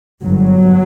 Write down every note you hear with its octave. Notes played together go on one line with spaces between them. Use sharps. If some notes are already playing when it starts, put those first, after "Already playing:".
G1 G2 F#3